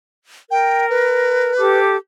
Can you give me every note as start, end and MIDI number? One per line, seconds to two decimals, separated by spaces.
0.51 1.53 70
0.51 0.86 79
0.90 1.79 71
1.58 1.96 67
1.58 1.96 69
1.58 1.96 86